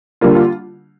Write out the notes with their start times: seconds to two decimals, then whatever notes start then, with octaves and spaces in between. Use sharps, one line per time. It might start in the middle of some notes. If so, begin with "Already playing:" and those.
0.21 D3 G3 A#3 F4
0.35 F4